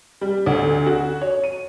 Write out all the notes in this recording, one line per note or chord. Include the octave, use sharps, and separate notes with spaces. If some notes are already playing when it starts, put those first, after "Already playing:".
G3
D2
F#4
C#5
D#7